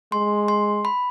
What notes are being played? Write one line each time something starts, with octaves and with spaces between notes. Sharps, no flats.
G#3 C6
C6
B5